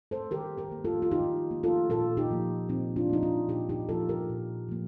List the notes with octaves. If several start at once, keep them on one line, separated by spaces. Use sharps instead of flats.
A4 C5
D#3 G4 A#4
G4 A#4
A#3
F4 A4
F4
D#3 D#4 G4
A#3
F4 A4
A#2 F4 A4
D#4 G4
F3 A#3
A#2 C4 D#4
D4 F4
F3 A#3 D#4
D4 F4
A#2 D#4 G4
D#4 G4
F3 A#3 F4 A4
G4 A#4
A#2
F3 A#3